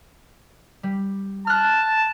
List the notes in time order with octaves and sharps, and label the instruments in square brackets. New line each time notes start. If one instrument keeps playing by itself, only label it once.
[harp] G3
[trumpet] A5 [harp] F6 F#6